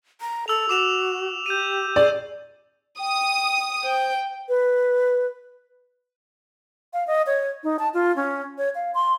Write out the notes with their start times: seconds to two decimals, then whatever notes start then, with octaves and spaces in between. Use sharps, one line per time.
0.21 A#5
0.48 A4 E6 F7
0.69 F#4 D6 E7 F7
1.46 G4 G6 D#7
1.96 G#4 D5
2.99 G5 D#6
3.83 C5 G5
4.49 B4
6.93 F5
7.07 D#5
7.27 C#5
7.63 D#4
7.79 A5
7.94 F4
8.16 C#4
8.58 C#5
8.75 F5
8.94 C6